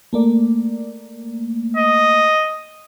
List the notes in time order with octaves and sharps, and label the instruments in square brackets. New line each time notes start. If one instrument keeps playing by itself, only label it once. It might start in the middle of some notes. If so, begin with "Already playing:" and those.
[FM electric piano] A3 A#3 D5
[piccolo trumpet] D#5